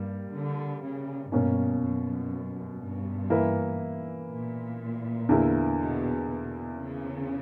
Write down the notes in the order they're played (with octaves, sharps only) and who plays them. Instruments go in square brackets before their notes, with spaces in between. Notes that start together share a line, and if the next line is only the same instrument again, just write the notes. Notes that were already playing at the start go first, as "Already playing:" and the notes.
Already playing: [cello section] G2 [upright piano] G3 A#3
[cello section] D3
C#3
[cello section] G2 [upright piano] B2 A#3 C#4
[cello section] F#2
G2
[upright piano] E3 A#3 E4 B4 E5
[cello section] A#2
[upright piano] E2 D3 A#3 E4
[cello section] B2
B2
C#3